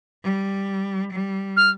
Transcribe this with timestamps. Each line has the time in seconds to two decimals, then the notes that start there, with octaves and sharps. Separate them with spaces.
0.24 G3
1.13 G3
1.57 F6